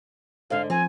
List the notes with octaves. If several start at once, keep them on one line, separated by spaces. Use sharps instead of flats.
G#2 D3 F5
F3 C4 G#5